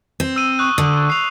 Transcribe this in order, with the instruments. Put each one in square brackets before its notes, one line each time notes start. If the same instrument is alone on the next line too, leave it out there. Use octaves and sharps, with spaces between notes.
[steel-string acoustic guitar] C4
[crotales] E6 D#7
C#6 D#6 F#6
[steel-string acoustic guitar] D3 [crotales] D#6
[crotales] C7 F7